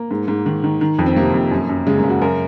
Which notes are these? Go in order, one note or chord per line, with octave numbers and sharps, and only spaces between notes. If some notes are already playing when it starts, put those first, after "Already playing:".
Already playing: A#3
G#2
G#2
D#3
D#3
D#3
F2
C4
C3 A#3
F2
F#2
F#2
C#3 G#3
A#3
C#3
F#4
F#2 A#4